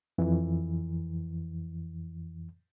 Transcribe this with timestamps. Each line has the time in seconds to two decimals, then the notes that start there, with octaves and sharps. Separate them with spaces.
0.18 F2 E3